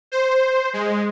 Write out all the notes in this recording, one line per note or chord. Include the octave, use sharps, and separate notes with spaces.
C5
G#3